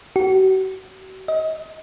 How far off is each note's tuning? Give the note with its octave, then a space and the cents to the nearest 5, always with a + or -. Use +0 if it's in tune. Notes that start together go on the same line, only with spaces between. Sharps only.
F#4 +40
D#5 +30